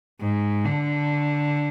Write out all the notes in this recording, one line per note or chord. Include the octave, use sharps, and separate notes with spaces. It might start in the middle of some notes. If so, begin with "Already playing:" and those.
G#2
D3